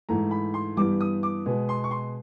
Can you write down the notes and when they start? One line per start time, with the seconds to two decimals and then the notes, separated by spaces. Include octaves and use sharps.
0.09 G#2 E3 A3 A#5
0.31 B5
0.54 C6
0.77 G2 E3 G3 B3 D6
1.01 D#6
1.23 D6
1.46 B2 G#3 B3
1.69 C6
1.84 C#6
1.91 C6